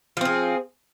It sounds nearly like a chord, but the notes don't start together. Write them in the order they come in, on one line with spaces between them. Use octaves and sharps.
F3 C4 G#4